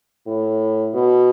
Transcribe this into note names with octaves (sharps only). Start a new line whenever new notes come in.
A2
B2